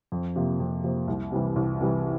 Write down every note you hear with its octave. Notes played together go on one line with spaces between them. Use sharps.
F2
C3 F3 A#3
F2
C3 F3 A#3
C2
C3 E3 G3
C2
C3 E3 G3